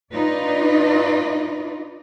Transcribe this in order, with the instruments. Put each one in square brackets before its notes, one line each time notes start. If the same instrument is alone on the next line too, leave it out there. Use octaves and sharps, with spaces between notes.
[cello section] D4 D#4 F4 B4 D5 D#5